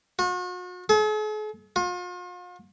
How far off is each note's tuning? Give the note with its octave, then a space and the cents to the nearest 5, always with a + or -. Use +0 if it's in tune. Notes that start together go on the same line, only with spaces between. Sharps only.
F#4 -45
G#4 +45
F4 +40